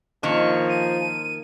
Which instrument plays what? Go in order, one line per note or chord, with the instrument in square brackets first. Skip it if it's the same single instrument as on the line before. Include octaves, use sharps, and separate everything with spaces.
[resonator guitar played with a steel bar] D#3 A#3 [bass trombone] F3 [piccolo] C#6
[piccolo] D#7